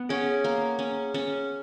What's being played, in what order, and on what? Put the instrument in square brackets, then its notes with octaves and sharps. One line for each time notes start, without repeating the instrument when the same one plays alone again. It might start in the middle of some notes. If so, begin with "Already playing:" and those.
Already playing: [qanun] B3
[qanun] C#4 [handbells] G#4 C#5 F#5
[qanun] A#3
C#4
C#4